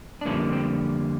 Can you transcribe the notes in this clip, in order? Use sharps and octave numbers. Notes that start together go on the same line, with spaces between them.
D4
F2 D3 G3 A#3 C#4
C4